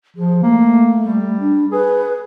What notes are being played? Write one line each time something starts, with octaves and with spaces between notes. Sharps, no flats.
F3 G#4
A3 A#3
G3
D4
G#4 B4